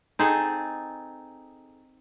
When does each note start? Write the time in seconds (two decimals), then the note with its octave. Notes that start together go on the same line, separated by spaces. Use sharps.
0.19 C4 D#4 G#4 A4